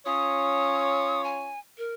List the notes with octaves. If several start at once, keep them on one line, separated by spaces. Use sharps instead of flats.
C#4 F4 C#5 D#6
G#5
A#4